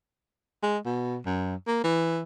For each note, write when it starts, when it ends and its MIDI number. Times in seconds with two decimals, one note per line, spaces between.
0.63 0.78 56
0.85 1.18 47
1.26 1.55 42
1.67 1.80 58
1.84 2.23 52